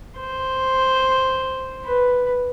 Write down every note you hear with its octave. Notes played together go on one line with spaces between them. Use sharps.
C5
B4